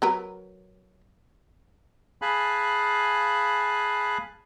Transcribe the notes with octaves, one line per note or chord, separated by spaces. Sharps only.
F#3 A#4 B4
G#4 F5 G#5 A5 B5 F#6